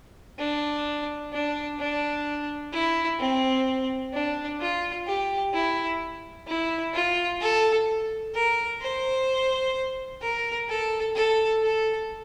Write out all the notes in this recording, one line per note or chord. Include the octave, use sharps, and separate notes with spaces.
D4
D4
D4
E4
C4
D4
F4
G4
E4
E4
F4
A4
A#4
C5
A#4
A4
A4
A4